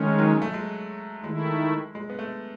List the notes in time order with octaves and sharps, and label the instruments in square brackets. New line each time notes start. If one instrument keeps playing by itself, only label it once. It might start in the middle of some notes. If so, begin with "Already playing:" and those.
Already playing: [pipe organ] D#3 G#3 C#4 [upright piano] A3
[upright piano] F#3
A3
G#3
[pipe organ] D#3 A3 E4 [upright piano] G#3
[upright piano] G#3
B3
A3